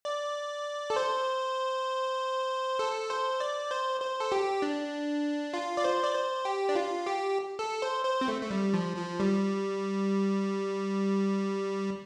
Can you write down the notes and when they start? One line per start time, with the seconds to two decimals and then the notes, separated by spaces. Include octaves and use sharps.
0.05 D5
0.90 A4
0.96 C5
2.79 A4
3.10 C5
3.40 D5
3.71 C5
4.01 C5
4.20 A4
4.32 G4
4.62 D4
5.53 F4
5.77 D5
5.84 C5
6.03 D5
6.15 C5
6.45 G4
6.69 D4
6.75 F4
7.06 G4
7.59 A4
7.82 C5
8.05 C5
8.21 C4
8.28 A3
8.42 A3
8.51 G3
8.74 F3
8.97 F3
9.20 G3